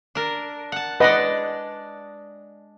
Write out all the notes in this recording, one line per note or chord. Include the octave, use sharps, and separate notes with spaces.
D4 A#4
F#5 A5
G#3 D4 B4 D5 D#5 F#5